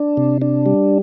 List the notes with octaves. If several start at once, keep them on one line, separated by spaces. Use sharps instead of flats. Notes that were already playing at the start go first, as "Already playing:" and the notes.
Already playing: D4
C3
D4
G3